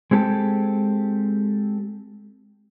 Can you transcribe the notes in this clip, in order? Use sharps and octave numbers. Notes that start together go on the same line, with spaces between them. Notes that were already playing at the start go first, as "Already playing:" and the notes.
G#3 C4 G4 A4